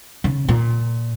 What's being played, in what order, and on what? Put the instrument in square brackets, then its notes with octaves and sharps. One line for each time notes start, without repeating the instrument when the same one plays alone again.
[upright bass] C#3
A#2